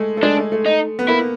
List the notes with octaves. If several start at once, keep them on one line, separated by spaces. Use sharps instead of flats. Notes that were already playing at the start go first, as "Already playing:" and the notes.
Already playing: G#3 A3
A3
G#3 D4
A3
A3
D#4
B3
A#3 E4